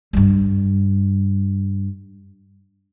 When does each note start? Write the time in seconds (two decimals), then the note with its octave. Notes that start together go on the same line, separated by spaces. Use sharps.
0.13 G2 G3